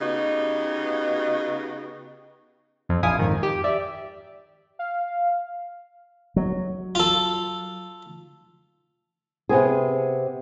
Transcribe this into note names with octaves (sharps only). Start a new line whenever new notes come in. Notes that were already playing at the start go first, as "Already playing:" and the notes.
C#3 B3 D#4 F#4 G4
F2
A#1 E4 F5 G#5 D#6
F2 G#2 D#3
G4
D5 E5
F5
F#3
F4 A4
C3 B3 C4 G#4